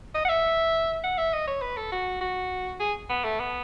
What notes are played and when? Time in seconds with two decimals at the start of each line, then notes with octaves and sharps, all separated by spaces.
0.15 D#5
0.25 F#5
0.29 E5
1.03 F#5
1.18 E5
1.33 D#5
1.47 C#5
1.62 B4
1.77 A4
1.92 F#4
2.21 F#4
2.80 G#4
3.09 B3
3.24 A3
3.40 B3